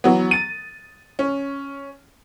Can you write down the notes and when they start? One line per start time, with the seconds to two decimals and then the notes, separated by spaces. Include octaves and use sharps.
0.04 E3 F#3 B3
0.31 A6 D#7
1.19 C#4